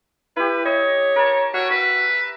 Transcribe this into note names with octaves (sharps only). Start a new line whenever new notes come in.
E4 G4 B4
C#5 D#5
A#4 A5
F#4 C#5 E5
B4 E5